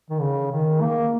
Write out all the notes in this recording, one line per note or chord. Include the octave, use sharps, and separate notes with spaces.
D#3
C#3
D#3
A#3